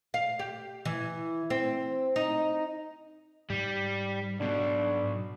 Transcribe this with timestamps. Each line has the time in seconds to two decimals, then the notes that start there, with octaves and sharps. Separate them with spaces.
0.14 F5
0.39 G4
0.85 E3
1.50 C4
2.16 D#4
3.50 G#2 G3
4.40 B1 B2 D4